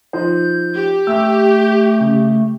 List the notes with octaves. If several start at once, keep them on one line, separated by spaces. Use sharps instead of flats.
F3 D#4 C5 G6
G4
A3 E6 G6
C#3